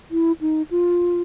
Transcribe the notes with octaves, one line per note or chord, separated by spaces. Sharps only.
E4
D#4
F4